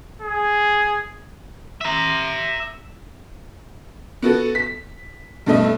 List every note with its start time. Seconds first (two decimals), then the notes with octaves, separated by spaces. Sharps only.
0.22 G#4
1.81 E5 A#5
4.22 B3 F#4 A4
4.55 B6
5.46 G2 B2 A3 D#5 E5